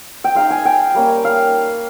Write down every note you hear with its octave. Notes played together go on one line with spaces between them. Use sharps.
G5
G#3 D#4 F5
G#5
G5
G3 A#3 C#4
F5